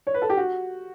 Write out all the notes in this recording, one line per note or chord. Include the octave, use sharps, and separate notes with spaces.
C#5
B4
A4
G4
F#4